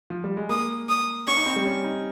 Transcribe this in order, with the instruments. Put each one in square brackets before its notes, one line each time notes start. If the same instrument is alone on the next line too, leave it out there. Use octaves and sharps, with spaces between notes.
[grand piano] F3
G3
G#3
[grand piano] A#3 [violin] D#6
[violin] D#6
[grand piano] C#4 [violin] C#6
[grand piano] D#4
C4
G3
C#4
D#4